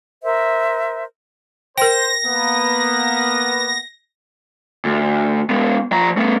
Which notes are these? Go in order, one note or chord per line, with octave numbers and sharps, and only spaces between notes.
A#4 C5 E5
A#4 C5 G5 A#6
A#3 B3
D2
G#3 B3
F3 A#5
A3 B3